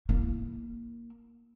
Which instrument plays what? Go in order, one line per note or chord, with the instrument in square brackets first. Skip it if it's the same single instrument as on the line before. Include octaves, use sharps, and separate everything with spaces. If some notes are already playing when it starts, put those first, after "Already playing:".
[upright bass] A#3 E4